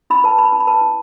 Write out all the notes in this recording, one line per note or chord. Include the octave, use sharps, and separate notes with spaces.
E4 B5
B4 A5
B4 B5
E4 A5
B5
B4 A5
E4